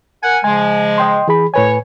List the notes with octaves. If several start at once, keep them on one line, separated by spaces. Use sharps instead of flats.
A#4 F#5 G#5
C#3 F3 G#3 G#5
D#5 G5 C6
E3 G#4 B5
A2 B4 C#5 G#5